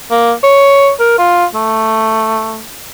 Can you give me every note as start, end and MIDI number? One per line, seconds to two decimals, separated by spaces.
0.11 0.32 58
0.44 0.91 73
1.00 1.15 70
1.18 1.46 65
1.55 2.64 57